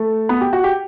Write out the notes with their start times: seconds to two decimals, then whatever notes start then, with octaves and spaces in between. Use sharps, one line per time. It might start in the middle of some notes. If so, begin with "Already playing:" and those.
Already playing: A3
0.29 B3
0.41 G4
0.53 F#4
0.64 G4